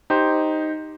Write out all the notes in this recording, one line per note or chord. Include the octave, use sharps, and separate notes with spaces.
D#4 G4 C5